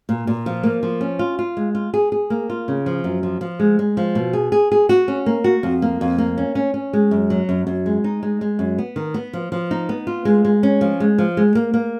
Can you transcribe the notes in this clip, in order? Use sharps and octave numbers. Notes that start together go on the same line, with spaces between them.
A#2
A#2
F3
A#3
F3
C#4
F4
F4
G#3
F4
G#4
G#4
A#3
F4
C#3
F3
F#2
F3
F3
G#3
G#3
F3
B2
G#4
G#4
G#4
F#4
C#4
A#3
F#4
F2
A#3
F2
A#3
C#4
C#4
C#4
G#3
F#2
F#3
F#2
F#2
G#3
D#4
G#3
G#3
F#2
B3
D#3
B3
F3
F3
D#4
B3
F4
G#3
G#3
C#4
F3
G#3
F3
G#3
A#3
A#3